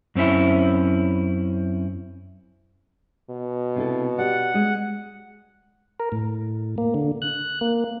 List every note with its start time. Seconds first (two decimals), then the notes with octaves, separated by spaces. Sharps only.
0.15 F#2 C4 C#4 E4
3.30 B2
3.76 C3 E4 A4
4.18 G4 D5 F#5
4.54 G#3 G#4
6.00 A#4
6.12 A2
6.78 A#3
6.94 D3
7.22 F#6
7.61 A#3